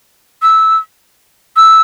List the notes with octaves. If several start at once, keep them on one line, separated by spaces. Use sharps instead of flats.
E6
E6